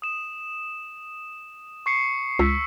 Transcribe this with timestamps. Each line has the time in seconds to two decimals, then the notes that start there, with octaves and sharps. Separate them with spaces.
0.02 D#6 E7
1.86 C#6 C7 C#7
2.39 C#2 E6 B6 C7